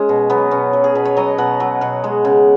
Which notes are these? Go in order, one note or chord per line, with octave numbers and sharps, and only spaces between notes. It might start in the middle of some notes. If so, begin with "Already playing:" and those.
Already playing: G#3 C#4
B2
F#3 B3
B2 C#4
F#3
G#4
B2 B4
C#5
F#3 D#5
B2 F#5
F#3
B2 F#5
G#3
C#3